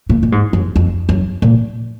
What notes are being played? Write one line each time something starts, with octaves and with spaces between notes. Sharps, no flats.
A#2
A#2
G#2
F#2
F2
F#2
A#2